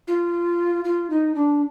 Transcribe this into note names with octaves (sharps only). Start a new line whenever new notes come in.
F4
F4
D#4
D4